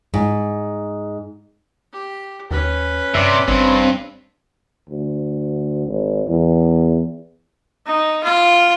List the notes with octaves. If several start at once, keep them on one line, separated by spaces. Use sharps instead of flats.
G#2
G4
D#2 C#4 B4
G2 C3 D5 E5
G#1 G2 C4
D2
G#1
E2
D#4
F4